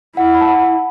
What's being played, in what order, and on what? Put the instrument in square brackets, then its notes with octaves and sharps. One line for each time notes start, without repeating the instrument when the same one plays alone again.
[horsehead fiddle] E4 [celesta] F#5
[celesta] B5
A5
F#5